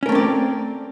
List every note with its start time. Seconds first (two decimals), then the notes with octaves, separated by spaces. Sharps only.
0.03 C#4
0.06 A#4
0.09 A3
0.12 C4
0.15 D5